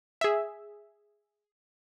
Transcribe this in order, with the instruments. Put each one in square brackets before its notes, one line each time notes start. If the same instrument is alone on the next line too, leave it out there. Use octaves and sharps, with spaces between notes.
[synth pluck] G#4 E5